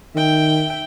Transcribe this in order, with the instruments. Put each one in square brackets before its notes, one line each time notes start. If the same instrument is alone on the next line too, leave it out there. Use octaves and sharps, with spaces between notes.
[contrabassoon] D#3 [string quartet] E5 G5